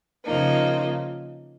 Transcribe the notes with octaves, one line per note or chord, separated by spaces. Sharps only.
C#3 F3 A#3 D#4